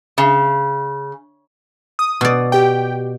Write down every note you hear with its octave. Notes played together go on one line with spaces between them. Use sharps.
C#3
D#6
B2 D5
G4 G5